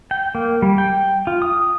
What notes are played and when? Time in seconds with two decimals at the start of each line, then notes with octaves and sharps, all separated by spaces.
0.11 G5
0.35 A#3
0.62 G3
0.78 G5
1.27 F4
1.42 D#6